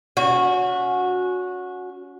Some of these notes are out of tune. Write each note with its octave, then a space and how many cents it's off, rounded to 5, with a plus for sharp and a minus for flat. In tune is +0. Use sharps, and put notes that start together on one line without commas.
C#4 +25 F#4 -20